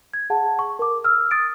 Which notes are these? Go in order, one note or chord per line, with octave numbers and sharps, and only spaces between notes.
G#6
G#4 F#5 A5
C#6
A#4 D6
E6 F6
D#6 A6 D7